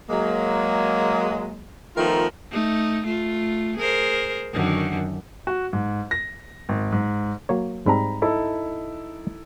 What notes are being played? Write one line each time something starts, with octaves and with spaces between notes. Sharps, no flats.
F#3 G#3 A#3
D#3 F3 A3 B3 F4 A#4
A3 D#4
A3 F4
G#4 A#4 C5
F#2 D3 D#3
F#4
G#2
A#6
G#1
G#2
F#3 A#3 C#5
G#2 G3 C4 A#5 B5
D#4 E4 A4